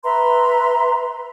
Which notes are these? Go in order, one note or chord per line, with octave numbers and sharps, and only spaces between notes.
B4 E5 A#5 C6